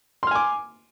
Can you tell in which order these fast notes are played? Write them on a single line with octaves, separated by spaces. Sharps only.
C6 F6 G#5 D6